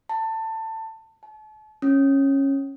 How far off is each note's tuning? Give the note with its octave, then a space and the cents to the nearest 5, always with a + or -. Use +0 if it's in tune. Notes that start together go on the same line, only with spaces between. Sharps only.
A5 +20
A5 -40
C#4 -15